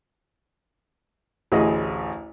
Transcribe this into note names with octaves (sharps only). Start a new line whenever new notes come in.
A1 D2 G#4 D#5